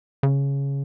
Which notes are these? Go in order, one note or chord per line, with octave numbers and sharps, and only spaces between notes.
C#3